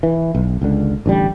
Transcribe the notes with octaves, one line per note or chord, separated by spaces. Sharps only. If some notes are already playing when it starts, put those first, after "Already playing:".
E3
B1
C#2 D3
A1 D3 D#3 G3